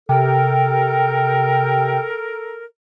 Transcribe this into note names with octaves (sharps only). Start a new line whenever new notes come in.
C3 A4 A#4 G5